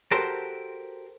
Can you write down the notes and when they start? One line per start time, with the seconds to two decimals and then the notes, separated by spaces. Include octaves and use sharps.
0.11 F#4 G4 A4 A#4 C5